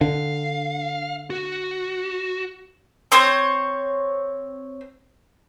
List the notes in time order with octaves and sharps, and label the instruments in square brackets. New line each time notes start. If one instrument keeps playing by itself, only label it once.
[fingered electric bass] D3 [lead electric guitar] F5
[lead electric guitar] F#4
[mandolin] C4 C5 C#5